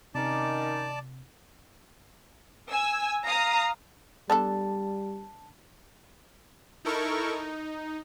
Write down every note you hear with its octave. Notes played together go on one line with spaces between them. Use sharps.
C3 D#3 C#4 D#4 D5 A5 D6
G#5 E6
F5 A#5 D#6
G3 B3 D4 A4 A5
D#4 E4 A4 A#4 C#6
D#4